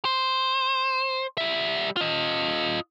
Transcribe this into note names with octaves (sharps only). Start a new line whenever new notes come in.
C5
G3 E5
F4 D#5